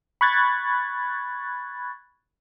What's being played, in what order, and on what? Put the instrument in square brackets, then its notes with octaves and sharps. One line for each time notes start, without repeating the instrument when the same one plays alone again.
[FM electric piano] B5 C#6 F#6 G#6 A6